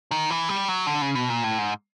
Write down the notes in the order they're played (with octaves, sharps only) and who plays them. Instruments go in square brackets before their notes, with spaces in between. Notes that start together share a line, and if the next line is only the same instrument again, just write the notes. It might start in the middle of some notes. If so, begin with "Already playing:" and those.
[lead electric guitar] D#3
E3
G3
F#3
D3
C#3
B2
A#2
A2
G#2